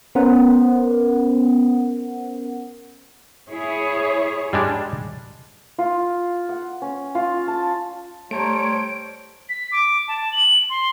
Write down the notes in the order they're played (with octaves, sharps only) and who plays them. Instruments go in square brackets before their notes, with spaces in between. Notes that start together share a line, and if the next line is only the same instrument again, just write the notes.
[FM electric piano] B3 C#4 A#4 C5 F#5
[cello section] E4 G#4 C#5
[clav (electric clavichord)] G3 G#3 D4
[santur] F4
F#5
C#4
F4
A5
[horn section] G3 C5 [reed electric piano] A3 A5 A#5 [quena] C#5 [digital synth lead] D7
[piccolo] B6
D6
A5
F#7
C6